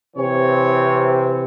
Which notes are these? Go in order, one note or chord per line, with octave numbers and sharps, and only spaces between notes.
C3 E3 C4 C#5